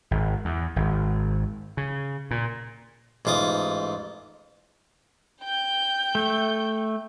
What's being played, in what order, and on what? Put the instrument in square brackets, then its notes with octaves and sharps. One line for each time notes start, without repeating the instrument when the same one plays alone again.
[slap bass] G#1
E2
G#1
C#3
A#2
[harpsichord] A1 G#2 F4 D6 D#6
[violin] G5 G6
[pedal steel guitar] A3